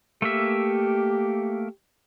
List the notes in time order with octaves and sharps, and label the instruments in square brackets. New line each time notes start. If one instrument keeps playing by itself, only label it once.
[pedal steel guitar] A3 A#3 E5 [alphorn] G4